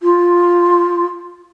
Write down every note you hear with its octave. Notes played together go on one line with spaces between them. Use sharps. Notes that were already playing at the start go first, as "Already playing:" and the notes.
F4